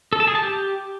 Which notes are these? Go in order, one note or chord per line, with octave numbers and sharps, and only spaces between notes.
A4
A5
G#4
A5
G4